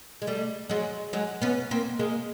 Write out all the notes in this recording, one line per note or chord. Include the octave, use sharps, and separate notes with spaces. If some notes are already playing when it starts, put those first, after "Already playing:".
G#3
G3 A3
F#3 G#3
F#3 G#3
B3 C#4
A#3 C4
G#3 A#3